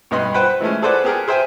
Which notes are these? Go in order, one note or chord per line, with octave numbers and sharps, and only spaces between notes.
B1 G2 B3 D#5 B5 C6
B4 C5 F#5 G5 B5
E3 G#3 A3 C#4
G#4 A4 B4 C5 D5 F#5
B3 G4 G#4 A#4
G#4 C5 E5 G5 G#5